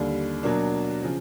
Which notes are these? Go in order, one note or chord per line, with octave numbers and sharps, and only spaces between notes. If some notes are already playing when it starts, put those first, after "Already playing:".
Already playing: D#2 D3 G3
B2 F#3 A#3 D4
C#3 F3